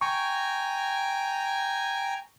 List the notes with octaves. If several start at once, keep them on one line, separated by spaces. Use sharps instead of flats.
G5 G#5 A#5 C#6